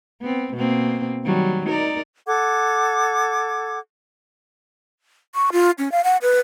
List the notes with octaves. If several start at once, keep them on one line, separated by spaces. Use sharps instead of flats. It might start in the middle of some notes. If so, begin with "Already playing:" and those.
B3 C4
B2 A#3 C4
D#3 F#3 G3
D#4 A#4 D5
A4 F#5 D6 G#6
C#6
F4
C#4
F5
F#5
B4